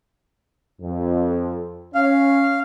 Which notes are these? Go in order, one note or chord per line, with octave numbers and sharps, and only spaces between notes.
F2
C#4 F5